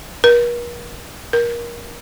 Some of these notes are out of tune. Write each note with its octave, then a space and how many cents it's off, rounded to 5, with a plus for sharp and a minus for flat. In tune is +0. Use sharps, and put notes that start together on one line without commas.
A#4 +45
A#4 +25